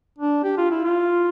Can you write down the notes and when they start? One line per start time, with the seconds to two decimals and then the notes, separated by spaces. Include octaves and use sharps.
0.19 D4
0.43 G4
0.57 F4
0.71 E4
0.84 F4